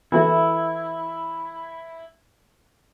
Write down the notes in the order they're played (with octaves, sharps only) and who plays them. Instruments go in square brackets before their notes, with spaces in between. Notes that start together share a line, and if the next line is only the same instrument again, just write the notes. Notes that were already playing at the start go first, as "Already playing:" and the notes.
[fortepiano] E3 F#4 A4 [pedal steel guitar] E4